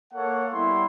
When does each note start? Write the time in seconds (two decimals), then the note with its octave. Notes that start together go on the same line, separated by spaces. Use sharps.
0.13 A#3 A4 C#5 F#5
0.53 G3 B3 E4 C6